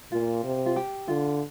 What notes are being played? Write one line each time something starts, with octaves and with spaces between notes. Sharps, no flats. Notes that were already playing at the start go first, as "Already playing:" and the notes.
A#2 F4
C3
F4
G4
D3 F4